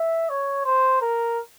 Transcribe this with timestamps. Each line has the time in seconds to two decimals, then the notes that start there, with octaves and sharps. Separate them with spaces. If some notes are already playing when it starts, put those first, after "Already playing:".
Already playing: E5
0.30 C#5
0.65 C5
1.01 A#4